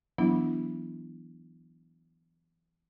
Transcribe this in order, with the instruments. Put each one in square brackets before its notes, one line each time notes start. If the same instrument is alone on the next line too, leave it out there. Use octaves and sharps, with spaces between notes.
[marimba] E3 F#3 B3 D4 E4